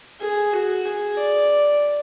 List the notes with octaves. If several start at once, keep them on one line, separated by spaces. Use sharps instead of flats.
G#4
F#4
G#4
D5